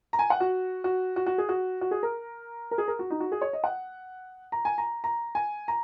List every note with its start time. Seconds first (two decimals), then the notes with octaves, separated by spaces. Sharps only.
0.13 A#5
0.19 G#5
0.30 F#5
0.40 F#4
0.84 F#4
1.16 F#4
1.26 F#4
1.38 G#4
1.49 F#4
1.81 F#4
1.91 G#4
2.03 A#4
2.71 A#4
2.78 G#4
2.88 A#4
2.99 F#4
3.10 D#4
3.20 F#4
3.32 G#4
3.41 C#5
3.53 D#5
3.64 F#5
4.52 A#5
4.65 G#5
4.78 A#5
5.04 A#5
5.35 G#5
5.68 A#5